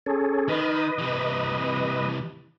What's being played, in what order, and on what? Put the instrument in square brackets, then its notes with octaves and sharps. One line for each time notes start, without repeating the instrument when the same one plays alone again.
[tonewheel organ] C#4 G#4 A4
[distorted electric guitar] D#3 [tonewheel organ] B4 D#5
[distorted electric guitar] C3 E3